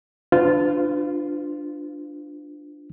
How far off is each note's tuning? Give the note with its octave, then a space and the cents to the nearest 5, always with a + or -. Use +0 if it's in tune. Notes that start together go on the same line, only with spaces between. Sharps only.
D4 +10 F4 +0 B4 +45